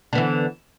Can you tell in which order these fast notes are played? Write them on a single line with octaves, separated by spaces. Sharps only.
D3 B3 E3